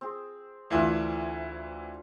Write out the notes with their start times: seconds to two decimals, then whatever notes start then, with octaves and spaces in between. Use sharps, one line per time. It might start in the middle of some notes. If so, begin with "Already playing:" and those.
0.01 C4 G#4
0.70 D2 E3 D4 E4 F4 A4